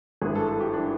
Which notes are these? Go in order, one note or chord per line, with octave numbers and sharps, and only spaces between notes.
G#1 G2 E3 G#4
A4
A4
G4
E3 D4